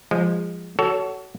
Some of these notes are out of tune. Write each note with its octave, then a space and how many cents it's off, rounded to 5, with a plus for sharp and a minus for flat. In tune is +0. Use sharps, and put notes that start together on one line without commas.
F3 +0 G#3 -20
F#4 +20 A4 +0 C#5 +30